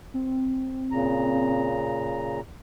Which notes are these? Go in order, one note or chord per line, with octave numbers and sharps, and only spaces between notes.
C4
A#2 C#3 A#5